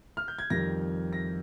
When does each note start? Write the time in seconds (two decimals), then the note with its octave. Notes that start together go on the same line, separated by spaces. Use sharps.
0.17 F6
0.28 G6
0.39 G#6
0.50 F2 D#3 G3 A#6
1.13 A#6